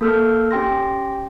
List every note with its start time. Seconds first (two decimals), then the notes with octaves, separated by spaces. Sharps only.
0.01 A#3 A4 E6 F6 G6
0.51 C#4 G4 G5 C6 A#6